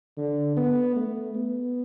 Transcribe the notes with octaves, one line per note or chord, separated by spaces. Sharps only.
D3
B3
A3
B3